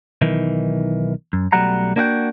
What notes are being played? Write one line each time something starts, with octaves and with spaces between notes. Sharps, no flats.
B1 D#3 E3
F#2
B1 F#3 G3 A3 F#5 A#5
A#3 D4 F#4 G#4 F#5 G5